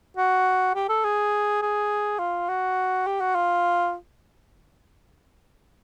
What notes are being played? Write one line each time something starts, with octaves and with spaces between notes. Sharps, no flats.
F#4
G4
A4
G#4
G#4
F4
F#4
G4
F#4
F4